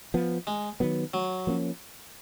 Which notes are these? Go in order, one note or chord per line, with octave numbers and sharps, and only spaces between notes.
F3 B3
G#3
D#3 F#3 B3
F#3
F3 A#3 C#4